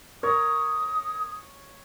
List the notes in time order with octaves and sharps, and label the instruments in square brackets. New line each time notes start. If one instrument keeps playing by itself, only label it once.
[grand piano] A#4 [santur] C#5 [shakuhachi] D#6